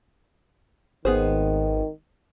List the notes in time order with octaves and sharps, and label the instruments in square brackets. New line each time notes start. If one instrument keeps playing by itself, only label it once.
[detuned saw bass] G#1 [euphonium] D#3 [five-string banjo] B3 G#4 C5